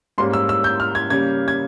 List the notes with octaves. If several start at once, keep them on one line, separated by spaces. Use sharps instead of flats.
G#2 G3 A#3 C#4 C6
E6
E6
G6
F6
G#6
C#3 G3 A#3 C#4 G#6
G#6